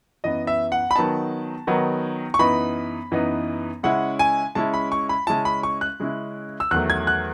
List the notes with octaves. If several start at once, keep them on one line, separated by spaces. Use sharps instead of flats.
F#2 E3 B3 D#5
E5
F#5
B5
D#3 F#3 B3 D#4 A5
D#3 F#3 B3 D#4
C#6
F#2 E3 B3 D#4 B5
F#2 E3 B3 D#4
C#3 G#3 C#4 E4 F#5
G#5
C#3 G#3 C#4 E4 A5
B5
C#6
B5
C#3 G#3 C#4 E4 A5
B5
C#6
F#6
C#3 G#3 C#4 E4
E6
E2 D#3 F#3 A3 F#6
G#6
F#6